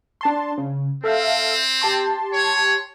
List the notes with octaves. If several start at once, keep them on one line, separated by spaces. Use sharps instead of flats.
D4 A5 C6
C#3
C4 A4 E5 F5
G4 A5 C6
C#5